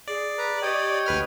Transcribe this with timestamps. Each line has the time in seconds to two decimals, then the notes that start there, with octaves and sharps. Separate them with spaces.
0.08 G#4 D5
0.38 B4 A#5
0.62 G4 C#5 D#5 G5
1.06 D2 B4 F6